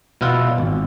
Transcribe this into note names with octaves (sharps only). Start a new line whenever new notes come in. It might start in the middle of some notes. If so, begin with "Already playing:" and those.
B2 E4 F4 E5 F#5
G#1